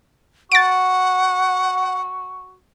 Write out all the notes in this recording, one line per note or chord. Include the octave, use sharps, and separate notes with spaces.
F#4 F#5 A6 D7